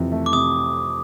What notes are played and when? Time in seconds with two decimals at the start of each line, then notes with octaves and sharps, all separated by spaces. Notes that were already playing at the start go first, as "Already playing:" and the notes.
Already playing: F2 C3 E3
0.12 A3
0.26 D6
0.32 C3 D#6